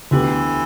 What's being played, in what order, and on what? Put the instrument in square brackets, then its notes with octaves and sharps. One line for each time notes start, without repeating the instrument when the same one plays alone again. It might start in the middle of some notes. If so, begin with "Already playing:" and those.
[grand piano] D2 D3 B3 G4 [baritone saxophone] E3